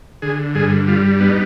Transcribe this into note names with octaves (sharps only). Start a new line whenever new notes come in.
D3 G#4
G2 G#4
G3 F4
B3 D4
D#4